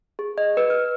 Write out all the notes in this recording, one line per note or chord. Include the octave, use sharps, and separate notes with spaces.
G#4
D#5
B4
F6